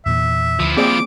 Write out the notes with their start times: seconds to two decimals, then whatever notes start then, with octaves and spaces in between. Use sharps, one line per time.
0.06 E2 A#2 E3 E5
0.60 D2 F3 E4
0.77 A#3 C4 G#4 D5 D6